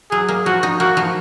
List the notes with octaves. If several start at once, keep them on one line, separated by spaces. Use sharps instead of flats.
F#3 G#4
A#3
F3 F#4
D#4
A#3 F#4
F3